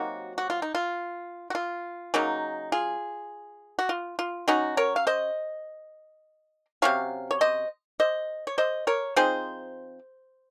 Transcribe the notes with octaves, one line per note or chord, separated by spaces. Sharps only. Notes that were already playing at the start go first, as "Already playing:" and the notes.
Already playing: C3 F#3 A#3 D#4 F#4
F#4
F4
D#4
F4
F#4
F4
C#3 F#3 A#3 D#4
F4 G#4
F#4
F4
F4
F#3 C#4 D#4 F#4
A#4 C#5
F5
C5 D#5
C3 F#3 C#4 C#5 F5
C#5
C5 D#5
C5 D#5
C#5
C5 D#5
A#4 C#5
F3 C4 D#4 G#4 C5